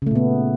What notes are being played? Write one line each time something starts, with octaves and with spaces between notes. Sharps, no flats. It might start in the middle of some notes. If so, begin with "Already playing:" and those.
A#2 C#3 A3 B3